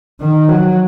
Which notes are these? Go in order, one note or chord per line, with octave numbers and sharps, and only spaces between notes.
D#3
F#3